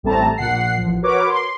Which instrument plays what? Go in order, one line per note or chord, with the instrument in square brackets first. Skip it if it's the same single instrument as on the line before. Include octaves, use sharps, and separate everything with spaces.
[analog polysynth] A1 G3 A3 C4 A5 A#5
A#1 A#2 F#5 C7
A1 F3
F#4 A#4 B4 C#5 D6
C6